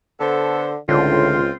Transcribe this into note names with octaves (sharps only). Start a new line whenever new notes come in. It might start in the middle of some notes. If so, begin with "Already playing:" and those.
D3 B3 A4 C5
C#2 A2 D3 C4 F4